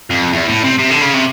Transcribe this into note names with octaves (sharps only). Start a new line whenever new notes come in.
F2
E2
A2
C3
C3
D3
C#3
C3